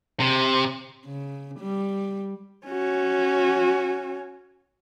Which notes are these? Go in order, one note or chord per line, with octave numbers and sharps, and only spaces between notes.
C3
C#3
G3
C#4 F#4